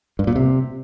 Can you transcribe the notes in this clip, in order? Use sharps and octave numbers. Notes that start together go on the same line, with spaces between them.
G2
A#2
C3